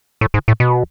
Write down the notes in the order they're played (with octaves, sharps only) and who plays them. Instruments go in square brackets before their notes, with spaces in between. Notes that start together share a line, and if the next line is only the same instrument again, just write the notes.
[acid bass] A2
G#2
A2
B2